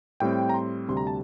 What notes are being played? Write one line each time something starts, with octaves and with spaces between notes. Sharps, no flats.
A2 G3 C4 G5
A#5
C6
D2 C3 G3 C6
A#5
A5